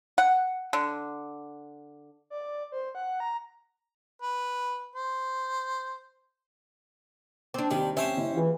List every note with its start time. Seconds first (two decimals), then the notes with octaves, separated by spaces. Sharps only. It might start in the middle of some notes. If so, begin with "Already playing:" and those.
0.18 F#5
0.73 D3
2.30 D5
2.72 C5
2.95 F#5
3.20 A#5
4.22 B4
4.95 C5
7.54 C4 D4 D6
7.71 D#2 C3 D#3 G3
7.97 C#4 G4 C5 C#5 E5
8.17 F#1 E4 D#5
8.35 E3 F4 G#4